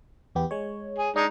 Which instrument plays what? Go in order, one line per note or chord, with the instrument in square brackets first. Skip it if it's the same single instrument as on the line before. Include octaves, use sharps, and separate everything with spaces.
[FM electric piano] E2 B3 G4
G#3 C#5
[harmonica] G#4
[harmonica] G#3 D#4 [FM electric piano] D4